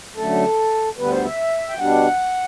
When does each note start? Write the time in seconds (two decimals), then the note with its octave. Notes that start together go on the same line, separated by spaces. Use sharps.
0.16 F#2 D3 A3 A4
0.97 D2 D3 G3 B3 B4
1.11 C5
1.25 E5
1.69 G5
1.79 B2 G3 D4 F#5